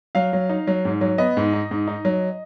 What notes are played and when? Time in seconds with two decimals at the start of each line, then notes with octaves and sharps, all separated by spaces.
0.15 F#3 F5
0.33 F#3
0.49 D#4
0.67 F#3
0.85 G#2
1.01 F#3
1.18 B3 D#5
1.37 G#2
1.53 D#4
1.71 G#2
1.88 D#4
2.05 F#3